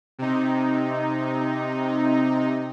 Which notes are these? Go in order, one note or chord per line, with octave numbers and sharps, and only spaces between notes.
C3 D#4